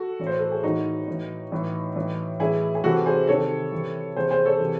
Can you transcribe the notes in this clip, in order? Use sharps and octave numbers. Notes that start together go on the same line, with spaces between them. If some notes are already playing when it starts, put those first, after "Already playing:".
Already playing: F#4 A4
A2 E3
C5
A4
G#4
A2 E3 D#4 F#4
A2 E3
A2 E3
A2 E3
A2 E3 E4 G#4
G#4
C3 E3 F#4 A4
G#4 C5
C3 D#3 A4 C#5
C3 E3
C3 E3 G#4 C5
G#4 C5
A4 C#5
C3 E3